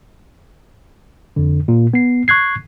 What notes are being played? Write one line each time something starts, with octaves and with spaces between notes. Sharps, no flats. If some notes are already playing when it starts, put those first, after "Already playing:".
F2 D3
A#2
B3 C7
C#6 F#6 G#6 C7